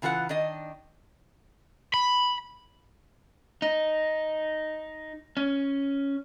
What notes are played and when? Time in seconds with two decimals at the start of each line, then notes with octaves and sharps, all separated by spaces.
0.02 C#3 E3 F4 G#4 F#5
0.29 D#3 D4 D#5
1.94 B5
3.62 D#4
5.37 C#4